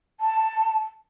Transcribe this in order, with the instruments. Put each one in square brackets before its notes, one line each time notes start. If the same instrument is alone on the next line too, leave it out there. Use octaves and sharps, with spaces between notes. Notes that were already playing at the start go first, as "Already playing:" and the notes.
[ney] A5